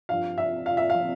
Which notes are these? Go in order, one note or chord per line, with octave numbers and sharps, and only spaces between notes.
G2 F3 F5
E5
F5
E5
F3 F5